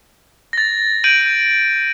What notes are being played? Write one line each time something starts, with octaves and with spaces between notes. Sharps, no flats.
A6 A#6
G6 D7 D#7 F#7